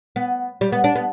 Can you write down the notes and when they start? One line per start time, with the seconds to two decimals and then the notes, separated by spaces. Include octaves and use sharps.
0.16 B3
0.61 G3
0.72 B3
0.84 D4
0.95 B3